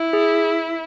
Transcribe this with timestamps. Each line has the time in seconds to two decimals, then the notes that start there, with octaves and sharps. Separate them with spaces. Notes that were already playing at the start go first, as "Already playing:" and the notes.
Already playing: E4
0.13 G#4